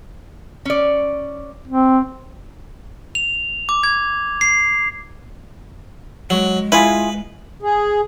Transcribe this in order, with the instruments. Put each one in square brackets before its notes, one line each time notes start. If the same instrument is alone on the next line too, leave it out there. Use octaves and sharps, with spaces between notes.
[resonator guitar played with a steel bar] C#4 D5
[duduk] C4
[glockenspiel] F7
D6
G#6
C7
[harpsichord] F#3 [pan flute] G#3
[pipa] E4 F4 G#4 [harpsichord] B4
[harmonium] G#4